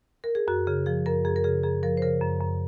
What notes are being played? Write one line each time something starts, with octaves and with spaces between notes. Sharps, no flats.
A#4
G#4
F#2 F#4
C#3 G#4
F3 G#4
F#2 A#4
F#2 G#4
A#4
C#3 G#4
F#2 G#4
F3 A#4
C5
C#3 A#4
F#2
F#2